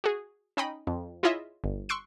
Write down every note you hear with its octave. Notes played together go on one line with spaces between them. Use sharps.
F#4 G#4
C#4 D#4 D#5 G5 B5
F2
E4 F4 G#4 C#5 D#5 E5
G1
C6 C#6 E6 F#6 C7 D7